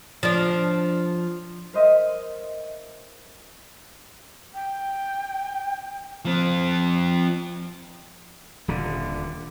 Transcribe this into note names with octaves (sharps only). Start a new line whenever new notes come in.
F3 D4
A#4 C5 D#5 E5
G5
F3 C4
D#1 D3